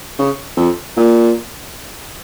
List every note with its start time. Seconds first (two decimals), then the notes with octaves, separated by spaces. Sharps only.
0.18 C#3
0.57 F2
0.96 A#2